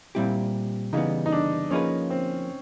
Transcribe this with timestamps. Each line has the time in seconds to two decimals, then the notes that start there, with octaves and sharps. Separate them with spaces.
0.15 A#2 G3 C4 E4 G4
0.93 C#3 E3 G3 B3 D#4
1.26 D#4
1.32 D4
1.70 F3 A#3 C#4 D#4 G#4 B4
2.10 C4